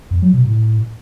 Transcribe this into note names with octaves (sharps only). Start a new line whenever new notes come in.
F2
F#3
B2
A2